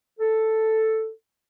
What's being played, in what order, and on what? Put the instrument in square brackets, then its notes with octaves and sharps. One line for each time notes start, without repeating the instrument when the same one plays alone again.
[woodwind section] A4